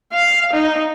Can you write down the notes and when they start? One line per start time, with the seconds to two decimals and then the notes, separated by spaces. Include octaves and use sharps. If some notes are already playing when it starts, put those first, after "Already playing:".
0.13 F5
0.53 D#4